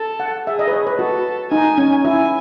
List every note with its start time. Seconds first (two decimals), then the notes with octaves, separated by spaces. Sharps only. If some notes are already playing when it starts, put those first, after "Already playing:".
Already playing: A4
0.20 F#5
0.47 G#4 E5
0.59 D#5
0.68 B4
0.73 C#5
0.87 B4
0.99 F#4 A4
1.52 D#4 G#5
1.78 C#4
2.04 E4 G#5